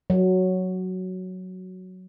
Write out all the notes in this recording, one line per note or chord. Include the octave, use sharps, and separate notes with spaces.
F#3